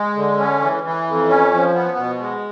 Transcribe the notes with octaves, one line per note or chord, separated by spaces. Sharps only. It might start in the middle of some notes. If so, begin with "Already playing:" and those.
Already playing: G#3
D3
C#4
E3
E3
F2
C#4
F3
B3
B2
G#3